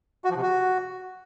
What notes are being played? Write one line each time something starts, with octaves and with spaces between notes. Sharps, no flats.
F#4
F3
C3
F#4